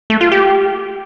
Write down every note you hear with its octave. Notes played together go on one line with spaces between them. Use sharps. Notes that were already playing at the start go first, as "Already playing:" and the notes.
A3
F4
G4